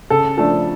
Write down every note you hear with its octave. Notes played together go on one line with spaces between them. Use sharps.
C#3 A4
F3 A3 D4 A4